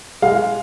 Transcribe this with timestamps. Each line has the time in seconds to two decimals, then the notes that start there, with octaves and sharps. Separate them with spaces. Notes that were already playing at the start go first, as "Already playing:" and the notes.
0.22 G#3 F5